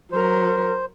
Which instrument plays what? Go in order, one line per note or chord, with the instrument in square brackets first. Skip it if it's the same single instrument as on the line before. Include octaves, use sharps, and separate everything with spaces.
[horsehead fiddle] F#3 A#4 [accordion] C5